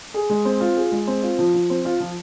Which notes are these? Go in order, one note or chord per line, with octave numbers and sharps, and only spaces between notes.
G#4
G#3
C4
F4
G#4
G#3
C4
F4
F3
F3
C4
F4
F3